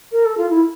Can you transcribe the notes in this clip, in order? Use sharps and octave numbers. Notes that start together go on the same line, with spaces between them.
A#4
A4
F4
E4